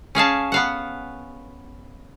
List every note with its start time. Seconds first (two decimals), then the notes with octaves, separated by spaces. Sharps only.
0.15 C#4 G#4 F5 A5
0.52 B3 F5 F#5